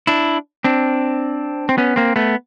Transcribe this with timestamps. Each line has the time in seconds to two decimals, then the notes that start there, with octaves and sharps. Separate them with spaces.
0.07 D4 E4
0.64 C4 D4
1.69 C4
1.78 B3 C#4
1.96 A#3 C4
2.16 A3 B3